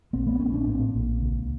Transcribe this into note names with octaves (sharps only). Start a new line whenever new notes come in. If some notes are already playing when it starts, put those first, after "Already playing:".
A#1 A#3 C4
A3 B3
A#1 B3 C#4
C4 D4
A2 A#3 C4
A#1
C#2